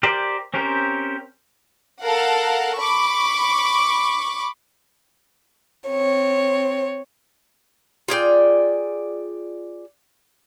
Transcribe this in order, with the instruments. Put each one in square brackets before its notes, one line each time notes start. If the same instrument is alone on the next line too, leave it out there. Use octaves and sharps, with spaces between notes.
[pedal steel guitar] G4 A#4 C5 D5
C4 C#4 G4 A#4 C5
[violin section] A4 A#4 F5 F#5
B5 C#6 D6
[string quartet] C4 C#5
[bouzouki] F4 G#4 D5 G5